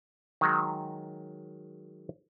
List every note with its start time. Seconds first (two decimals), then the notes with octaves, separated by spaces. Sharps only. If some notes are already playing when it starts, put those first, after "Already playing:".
0.41 D#3 F#3 G#3